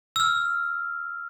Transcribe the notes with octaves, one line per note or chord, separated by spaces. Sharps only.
E6 F6